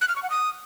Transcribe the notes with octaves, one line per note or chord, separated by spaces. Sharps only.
F#6
F6
C#6
F#5
D#6